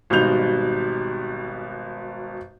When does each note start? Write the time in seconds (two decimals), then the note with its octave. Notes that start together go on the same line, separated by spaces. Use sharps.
0.10 G#1 B2 G3 D#4 G6 F7